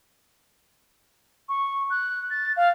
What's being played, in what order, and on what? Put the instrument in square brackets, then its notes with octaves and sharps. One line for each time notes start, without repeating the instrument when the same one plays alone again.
[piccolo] C#6
F#6
A6
F5